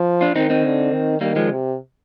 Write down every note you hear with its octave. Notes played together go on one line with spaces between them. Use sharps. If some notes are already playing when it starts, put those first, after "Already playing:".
Already playing: F3
D4 F4
D#3 C4 D#4
C4 D#4
D3
D#3
D#3 G3 A#3
F3 G#3
C3